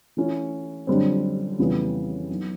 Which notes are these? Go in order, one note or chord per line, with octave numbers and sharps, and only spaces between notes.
E3 A3 C#4 E4
F#2 D3 G3 C4
F2 C#3 E3 G3 B3
F#3 B3 D#4